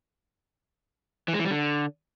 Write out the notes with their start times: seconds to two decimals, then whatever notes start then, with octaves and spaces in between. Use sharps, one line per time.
1.28 E3
1.34 G#3
1.39 E3
1.45 G3
1.50 D3